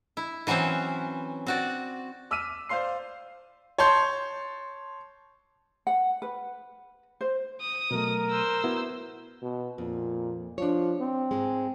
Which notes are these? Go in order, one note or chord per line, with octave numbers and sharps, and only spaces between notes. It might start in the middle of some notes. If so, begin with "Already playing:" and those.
E4
E3 F#3 C4 C#4 C5
C4 F#4 D5
D6 E6 F6 B6 D#7
C5 D5 F5 C6 C7
C#5 A5 C6 G6
F#5
B4
C5
D#6
B2 F#3 A3 A#4
C5 E6
B3 E4 F#4
B2
F2 A#2
F3 D4 C#5
C4
G#2 G#3